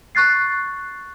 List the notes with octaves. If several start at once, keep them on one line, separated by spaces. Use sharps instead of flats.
C#6 F#6 A6 C7